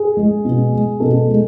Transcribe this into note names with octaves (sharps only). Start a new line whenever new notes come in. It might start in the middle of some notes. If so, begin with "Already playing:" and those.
Already playing: G#4
G#3
B2
G#3
B2 A4
G#3